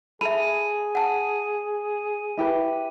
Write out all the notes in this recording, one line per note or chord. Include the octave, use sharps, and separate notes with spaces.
G#4 A4 E5 B5 D#7
F#5 A5
E4 G4 B4